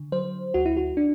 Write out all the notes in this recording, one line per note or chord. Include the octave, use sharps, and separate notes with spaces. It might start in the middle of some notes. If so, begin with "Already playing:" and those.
Already playing: D3
F#3 C5
D2 F#4
E4
F#4
D4